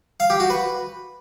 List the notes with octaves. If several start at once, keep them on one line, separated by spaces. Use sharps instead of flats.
F5
G4
F#4
B4